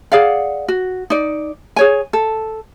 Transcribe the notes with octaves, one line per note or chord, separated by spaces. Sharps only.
G#4 D5 F5 F#5
F#4
D#4 D5
G#4 C#5 G#5
A4